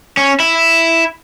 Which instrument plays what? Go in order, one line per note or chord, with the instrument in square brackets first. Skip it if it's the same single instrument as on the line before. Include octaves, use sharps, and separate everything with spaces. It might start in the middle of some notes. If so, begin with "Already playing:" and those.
[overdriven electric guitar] C#4
E4